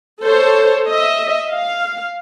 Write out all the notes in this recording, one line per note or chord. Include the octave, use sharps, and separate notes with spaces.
A4 C5 C#5
D#5 E5
F5